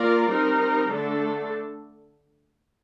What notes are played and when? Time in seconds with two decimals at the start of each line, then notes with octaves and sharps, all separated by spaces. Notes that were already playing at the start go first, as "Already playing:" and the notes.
Already playing: A#3 F4 A#4 D5
0.29 G3 C4 D#4 A#4
0.90 D3 A3 D4 A4